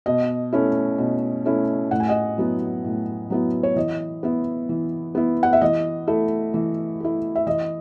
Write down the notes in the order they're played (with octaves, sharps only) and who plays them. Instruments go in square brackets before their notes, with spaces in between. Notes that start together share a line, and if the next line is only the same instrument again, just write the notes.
[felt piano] B2 D#5
A3 C#4 E4
B2
A3 C#4 E4
A2 F#5
G#5
D#5 F#5
F#3 B3 E4
A2
F#3 B3 E4
C#5
E3 D#5
B3 E4
E3
B3 E4
F#5
E5
E3 D#5
A3 E4
E3
A3 E4
E5
E3 D#5